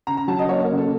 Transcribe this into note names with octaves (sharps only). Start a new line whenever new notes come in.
C#3 A#5
A#5
F#3 A5
D#5
A#3 C#5
A#4
C#3
A4